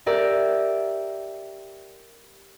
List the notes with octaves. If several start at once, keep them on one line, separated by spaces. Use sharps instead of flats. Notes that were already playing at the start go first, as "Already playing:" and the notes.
G4 A#4 D5 E5